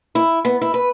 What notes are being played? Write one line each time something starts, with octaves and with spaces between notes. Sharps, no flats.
E4
B3
E4
B4